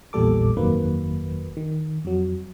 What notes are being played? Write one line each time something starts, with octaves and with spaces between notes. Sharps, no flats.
A#1 E2 A#2 G3 A4 D6
G1 F2 D#3 F#3 A#3 B4
D#3
F2 F#3